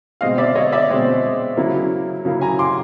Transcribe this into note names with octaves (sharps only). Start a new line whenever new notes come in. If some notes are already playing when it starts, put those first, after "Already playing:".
B2 G#3 C4 D#5 F5
D5 E5
C#5 D#5
D5 E5
B2 G#3 C4
C#3 F#3 A#3 C#4 E4
C#3 F#3 A#3 C#4 E4
G#5 A#5
C6 D6